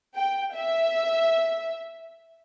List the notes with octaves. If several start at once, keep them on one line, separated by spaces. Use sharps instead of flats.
G5
E5